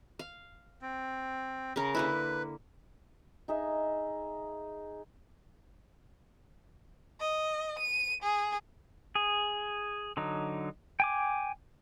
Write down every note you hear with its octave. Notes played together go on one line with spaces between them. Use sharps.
F5
C4
C#3 A#4
D3 A#3 E4 B4
D#4 G#4 D#5 E5
D#5
D#7
G#4
G#4
D3 F#3 D#4
G5 G#5 D6